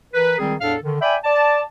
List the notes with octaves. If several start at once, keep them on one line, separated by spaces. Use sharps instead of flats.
E3 A#4 B4
C#2 D#3 G3 C4 G#4
E2 A2 D4 A4 F5
D3 D#3
D5 E5 G5 G#5 B5
D5 A5